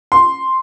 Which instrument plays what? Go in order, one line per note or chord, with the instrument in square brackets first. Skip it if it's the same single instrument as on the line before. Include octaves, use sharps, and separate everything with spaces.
[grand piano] C6